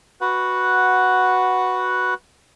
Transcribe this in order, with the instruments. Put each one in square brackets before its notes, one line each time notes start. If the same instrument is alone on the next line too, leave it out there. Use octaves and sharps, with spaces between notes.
[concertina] F#4 B4 F#5